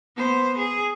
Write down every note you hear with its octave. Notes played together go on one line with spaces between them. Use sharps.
B3 C5
G#4